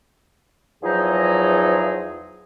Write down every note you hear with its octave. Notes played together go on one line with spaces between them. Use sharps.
E2 F3 F#3 D#4 G#4